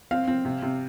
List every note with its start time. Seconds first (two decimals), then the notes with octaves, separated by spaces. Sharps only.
0.11 C4 F5
0.28 C4
0.45 C3
0.62 C3